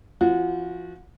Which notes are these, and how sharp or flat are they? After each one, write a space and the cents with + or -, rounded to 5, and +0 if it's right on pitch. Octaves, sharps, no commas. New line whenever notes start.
F3 -35 C4 +0 F#4 -25